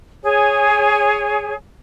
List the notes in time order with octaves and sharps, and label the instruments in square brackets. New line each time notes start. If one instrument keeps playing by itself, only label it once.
[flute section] G#4 C#5